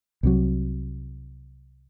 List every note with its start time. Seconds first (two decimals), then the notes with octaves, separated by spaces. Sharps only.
0.23 C2 C3 F#3